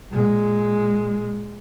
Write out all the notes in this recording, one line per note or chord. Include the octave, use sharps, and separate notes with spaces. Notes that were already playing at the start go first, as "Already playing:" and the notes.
A#2 G#3